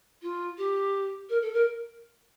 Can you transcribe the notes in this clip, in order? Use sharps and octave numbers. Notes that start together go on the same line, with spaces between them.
F4
G4
A#4
A4
A#4